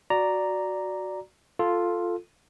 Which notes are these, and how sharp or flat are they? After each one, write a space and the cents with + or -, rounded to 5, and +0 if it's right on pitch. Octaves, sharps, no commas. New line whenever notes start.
F#4 +0 D5 +0 A#5 +0
F4 +0 A4 +0